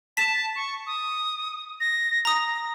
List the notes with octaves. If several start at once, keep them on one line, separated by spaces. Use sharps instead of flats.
A5 B6 E7
C#6
D#6
A#6
A#5 D#6 A#6